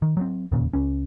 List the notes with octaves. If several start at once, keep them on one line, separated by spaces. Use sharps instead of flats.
D#3
F#3 G3 C4
E1 D#2 A#2 C#3
C#2 C#4